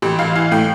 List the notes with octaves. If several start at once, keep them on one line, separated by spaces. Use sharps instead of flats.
A1 G4
A1 F5
E3 F5
A2 G5